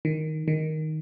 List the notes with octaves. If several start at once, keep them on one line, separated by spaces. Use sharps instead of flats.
D#3
D#3